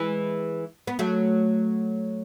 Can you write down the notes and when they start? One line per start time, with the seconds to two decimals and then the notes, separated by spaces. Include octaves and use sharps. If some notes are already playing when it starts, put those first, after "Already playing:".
Already playing: E3 G#3
0.87 B3
0.99 F#3 A3